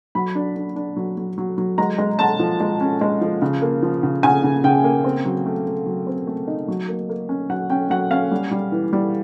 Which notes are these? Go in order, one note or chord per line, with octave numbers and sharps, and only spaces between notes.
F#3 B5
D4
D4
D4
F#3
F#3
F#3
F#3
G#3 A#5
G#3
G#3 A5
F3
G#3
C#4
G#3
F3
C#3
A#3
F3
C#3
C#3 G#5
C#3
C#3 G5
A#3
C4
F#3
A3
A3
F#3
C4
A3
D#4
F#3
A#3
A#3
C#4
F#3 F#5
C#4 G5
F#3 F#5
C#4 F5
G3
G3
E3
G3